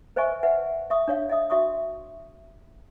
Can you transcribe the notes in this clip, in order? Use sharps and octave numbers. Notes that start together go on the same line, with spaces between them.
B4 C5 D#5 E5 G#5 C#6
B4 E5 F#5
E5 C#6 D#6
D4 C#5 F5
D#5 E5 D#6
F#4 E5 C#6 D#6